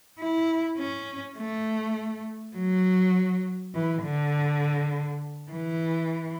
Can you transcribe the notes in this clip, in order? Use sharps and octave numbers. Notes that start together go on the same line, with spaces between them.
E4
C#4
A3
F#3
E3
D3
E3